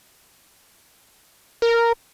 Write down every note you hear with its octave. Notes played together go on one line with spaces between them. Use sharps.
A#4